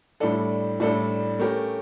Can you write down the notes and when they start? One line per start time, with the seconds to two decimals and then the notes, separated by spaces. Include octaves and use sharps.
0.20 A2 G3 D4 A4
0.80 A2 G3 D4 A4
1.39 A3 C#4 G4 A#4